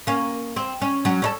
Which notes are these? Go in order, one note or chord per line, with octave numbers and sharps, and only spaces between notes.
A#3 C#4
C4
C#4
F#3 C#4
C#4 D#4 A4